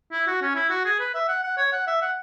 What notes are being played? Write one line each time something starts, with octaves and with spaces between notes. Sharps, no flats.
E4
F#4
C#4
E4
F#4
G#4
B4
E5
F#5
F#5
C#5
F#5
E5
F#5